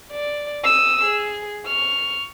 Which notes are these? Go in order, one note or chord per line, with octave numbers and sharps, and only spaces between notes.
D5
D#6 E6
G#4
C#6 F6